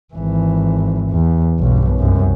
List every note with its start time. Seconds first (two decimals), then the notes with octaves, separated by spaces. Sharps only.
0.14 G#1 E3
1.11 E2
1.60 B1 G2
1.97 C2 F#2